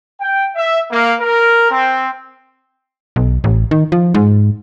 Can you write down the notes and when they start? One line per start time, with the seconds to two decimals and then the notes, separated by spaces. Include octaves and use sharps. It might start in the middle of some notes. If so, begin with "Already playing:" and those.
0.21 G5
0.54 E5
0.90 A#3
1.21 A#4
1.71 C4
3.16 B1
3.44 A1
3.71 D#3
3.92 F3
4.14 G#2